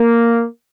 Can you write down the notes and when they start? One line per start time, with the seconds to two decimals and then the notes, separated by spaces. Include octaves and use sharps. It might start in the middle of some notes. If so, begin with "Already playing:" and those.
Already playing: A#3